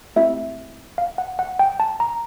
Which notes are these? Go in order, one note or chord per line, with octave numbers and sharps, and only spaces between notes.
A3 C4 E4 G4 E5
F5
F#5
F#5
G5
A5
A#5